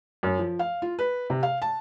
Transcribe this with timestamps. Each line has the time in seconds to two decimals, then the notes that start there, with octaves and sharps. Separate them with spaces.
0.23 F#2
0.39 F3
0.59 F5
0.82 F4
0.99 B4
1.30 C3
1.43 F5
1.62 A5